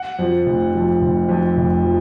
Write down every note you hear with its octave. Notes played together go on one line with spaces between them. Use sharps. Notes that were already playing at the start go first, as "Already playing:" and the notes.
Already playing: F#5
F2 F3
F1
F2 F3
F1
F2 F3
F1
F3